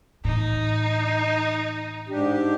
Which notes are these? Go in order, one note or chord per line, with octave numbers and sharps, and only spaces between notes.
A2 E3 D#4
G#2 D4 G4